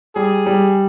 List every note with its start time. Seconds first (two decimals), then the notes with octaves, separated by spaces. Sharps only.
0.15 G3 G#4
0.46 G3